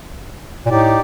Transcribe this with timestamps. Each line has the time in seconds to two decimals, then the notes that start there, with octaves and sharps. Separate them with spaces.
0.66 A#2
0.70 A2 D#4 G4 D5